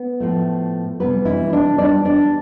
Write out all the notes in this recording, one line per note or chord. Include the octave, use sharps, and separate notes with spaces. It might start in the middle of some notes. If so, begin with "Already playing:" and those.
Already playing: B3
A2 F3 A3
E2 C3 G3 B3 B4
E3 E4
D4 D5
E2 C3 G3 D4 D5
D4 D5